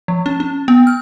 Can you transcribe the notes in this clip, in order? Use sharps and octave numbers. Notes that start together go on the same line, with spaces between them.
F3
C#4
C#4
B3
F6